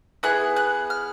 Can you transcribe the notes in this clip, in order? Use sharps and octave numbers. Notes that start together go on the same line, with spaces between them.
B3 E4 G#4 F#6
F#6
F6